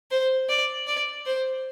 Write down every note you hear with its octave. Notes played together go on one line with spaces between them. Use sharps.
C5
D5
D5
C5